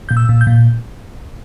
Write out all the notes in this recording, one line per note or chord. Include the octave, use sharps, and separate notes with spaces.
A#2 G6
E6
A#2
G6
A#2